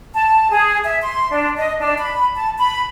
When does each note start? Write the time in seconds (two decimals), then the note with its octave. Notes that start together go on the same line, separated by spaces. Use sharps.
0.15 A5
0.51 G#4
0.84 E5
1.02 C6
1.32 D4
1.57 D#5
1.80 D4
1.97 B5
2.36 A5
2.58 B5